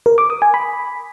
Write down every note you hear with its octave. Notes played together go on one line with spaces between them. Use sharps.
A#4
D6
D#6
G#5
B5